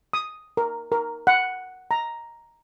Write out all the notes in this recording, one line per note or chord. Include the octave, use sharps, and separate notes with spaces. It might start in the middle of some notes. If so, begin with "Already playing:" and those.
D#6
A#4
A#4
F#5
A#5